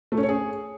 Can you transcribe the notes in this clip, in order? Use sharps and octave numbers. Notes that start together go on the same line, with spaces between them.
A3
C#4
C#5
G#4